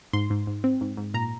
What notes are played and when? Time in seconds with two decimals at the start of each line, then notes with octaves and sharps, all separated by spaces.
0.13 G#2 C6
0.30 G#2
0.47 G#2
0.64 C4
0.81 G#2
0.97 G#2
1.14 A#2 A#5